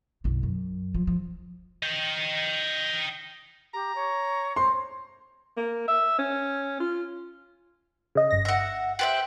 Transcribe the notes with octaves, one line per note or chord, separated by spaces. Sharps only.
F#1 B1
F#2
F3
F3
D#5 G5
G4 A#5
C#5
C5 C6
A#3
E5
C#4
F4
C#3 D#5
G1 A#6
E5 F#5
G4 C5 E5 F#6